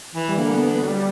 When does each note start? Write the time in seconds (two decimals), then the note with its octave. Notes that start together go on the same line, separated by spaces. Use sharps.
0.15 E3
0.29 G3
0.37 D3 A#3
0.54 B3
0.71 B3
0.83 F#3
0.88 G3